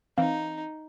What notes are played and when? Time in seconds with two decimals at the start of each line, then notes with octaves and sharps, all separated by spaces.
0.18 E3 C4 D#4 F5